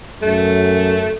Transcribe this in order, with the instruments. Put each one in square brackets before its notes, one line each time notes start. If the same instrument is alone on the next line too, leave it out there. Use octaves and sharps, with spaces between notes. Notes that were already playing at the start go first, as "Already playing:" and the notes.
[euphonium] F#2 [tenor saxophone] A3